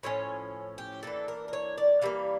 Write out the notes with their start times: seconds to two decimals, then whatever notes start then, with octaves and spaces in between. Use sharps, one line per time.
0.03 A2 F3 C#4 C#5
0.78 G4
1.03 E3 A#3 D4 A4
1.28 A#4
1.48 A#4
1.53 C#5
1.78 D5
2.02 E3 G3 A#3 F5